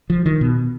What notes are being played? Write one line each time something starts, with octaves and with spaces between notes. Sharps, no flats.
F3
D#3
B2